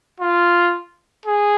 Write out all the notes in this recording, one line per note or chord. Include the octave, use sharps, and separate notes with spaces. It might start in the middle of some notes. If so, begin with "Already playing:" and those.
F4
G#4